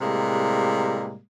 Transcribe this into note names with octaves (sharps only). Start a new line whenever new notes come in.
A2 C3 G3 G#3 A#3